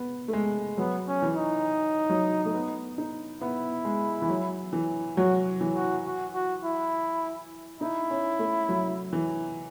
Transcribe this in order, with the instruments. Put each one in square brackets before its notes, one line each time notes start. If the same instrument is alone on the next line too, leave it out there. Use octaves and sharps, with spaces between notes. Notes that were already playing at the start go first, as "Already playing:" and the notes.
Already playing: [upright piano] B3
A3
G#3
[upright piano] F#3 [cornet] B3
[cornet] C#4
[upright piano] E3
[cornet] D#4
[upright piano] F#3
A3
B3
D#4
[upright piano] B3 [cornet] E4
[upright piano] G#3
E3
F#3
E3
[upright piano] F#3 [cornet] F#4
[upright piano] E3
[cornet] F#4
F#4
F#4
E4
[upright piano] D#4 [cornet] E4
[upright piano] C#4
A3
F#3
E3